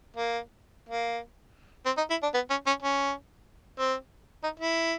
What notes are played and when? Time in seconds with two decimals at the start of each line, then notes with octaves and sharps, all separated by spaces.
0.16 A#3
0.89 A#3
1.86 C4
1.97 D#4
2.10 E4
2.23 D4
2.34 B3
2.50 C#4
2.67 C#4
2.83 C#4
3.79 C4
4.44 D#4
4.60 E4